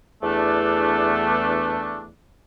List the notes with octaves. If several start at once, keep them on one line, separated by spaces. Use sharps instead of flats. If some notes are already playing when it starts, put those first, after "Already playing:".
E2 A3 D4